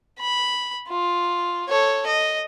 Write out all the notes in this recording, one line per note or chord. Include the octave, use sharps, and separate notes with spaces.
B5
F4
A4 C#5
D#5